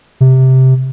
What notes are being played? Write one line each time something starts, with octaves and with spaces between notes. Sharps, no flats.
C3